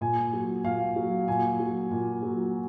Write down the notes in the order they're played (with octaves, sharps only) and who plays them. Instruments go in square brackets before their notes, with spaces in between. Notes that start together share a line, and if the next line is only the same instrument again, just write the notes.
[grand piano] A#2 G#5
F#3
A#2 F5
F#3
A#2 G#5
F#3
A#2
F#3